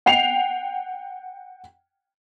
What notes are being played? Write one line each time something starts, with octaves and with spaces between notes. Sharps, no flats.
F#5 G5 C7 F7